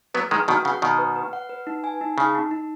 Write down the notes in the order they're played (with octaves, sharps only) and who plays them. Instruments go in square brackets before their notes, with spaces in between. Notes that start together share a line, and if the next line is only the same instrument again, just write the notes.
[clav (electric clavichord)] F#3 B3 [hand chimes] B4
[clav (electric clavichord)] D#3 G#3 [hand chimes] B4
[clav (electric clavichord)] B2 D#3 [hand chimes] F#4
[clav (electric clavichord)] C#3 [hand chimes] F#5
[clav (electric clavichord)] B2 D#3 [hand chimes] F#5
[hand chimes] B4
B4
F#5
B4
D#4
G#5
D#4
[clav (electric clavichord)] C#3 [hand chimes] D#4
[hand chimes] D#4
D#4